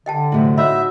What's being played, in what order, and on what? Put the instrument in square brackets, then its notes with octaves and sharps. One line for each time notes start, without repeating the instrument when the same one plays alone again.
[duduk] D3 [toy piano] D#5 G5 A5
[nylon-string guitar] A2 C3 F#3 [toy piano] E4 G#4
[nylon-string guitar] D#4 F#4 D#5 [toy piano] C#5 B5 [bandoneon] E5